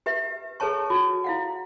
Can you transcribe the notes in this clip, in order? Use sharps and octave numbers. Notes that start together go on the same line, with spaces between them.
G4 B4 E5
G#4 A4 B4 C#5 A5 C#6
F#4
E4 F5 F#5